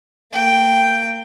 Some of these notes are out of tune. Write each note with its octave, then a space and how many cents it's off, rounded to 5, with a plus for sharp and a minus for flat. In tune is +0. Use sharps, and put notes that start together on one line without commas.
A#3 -35 G5 +0